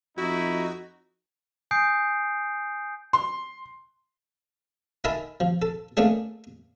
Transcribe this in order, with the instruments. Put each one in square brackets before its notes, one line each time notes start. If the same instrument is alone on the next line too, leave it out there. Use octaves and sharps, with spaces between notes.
[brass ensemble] F2 D#4 [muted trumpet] E4 [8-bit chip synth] F#4
[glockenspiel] G#5 D#6 G6 C7 D7
[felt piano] C6
[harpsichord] D#4 A#4 E5 G#5 A5 B5
F3
A4
A3 A#3 C#4 D4 G#4